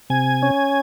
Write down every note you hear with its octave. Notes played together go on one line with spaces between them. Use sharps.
C3 G#5
C#4